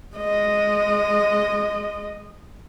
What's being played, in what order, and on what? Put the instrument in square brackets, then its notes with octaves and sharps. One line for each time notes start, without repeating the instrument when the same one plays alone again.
[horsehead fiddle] G#3 D#5